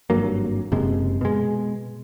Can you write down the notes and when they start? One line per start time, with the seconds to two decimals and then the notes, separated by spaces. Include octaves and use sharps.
0.10 G#1 G2 F#3 A#3
0.72 F#1 F#2 C3 G#3
1.21 B2 G#3